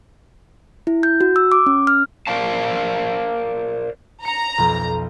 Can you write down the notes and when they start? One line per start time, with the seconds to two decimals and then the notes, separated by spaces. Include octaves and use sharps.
0.87 E4
1.03 G6
1.21 F#4
1.36 E6
1.52 D6
1.66 C#4
1.87 F6
2.27 A#4 C5 D5 F5 A5
4.25 A#5 C#7
4.58 B1 F2